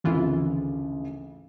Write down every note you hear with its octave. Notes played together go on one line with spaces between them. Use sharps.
G#1 D2 C#3 E3 F4